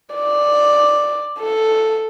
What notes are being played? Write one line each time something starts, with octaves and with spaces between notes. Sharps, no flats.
D5
A4